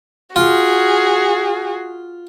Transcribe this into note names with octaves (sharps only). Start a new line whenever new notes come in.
F4 F#4 G#4